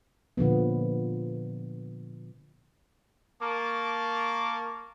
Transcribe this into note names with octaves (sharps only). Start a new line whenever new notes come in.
A#2 D3 F3 B3
A#3 A#4 A5 C#6 D6